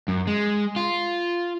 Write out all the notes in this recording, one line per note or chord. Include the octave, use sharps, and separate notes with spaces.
F#2
G#3
F4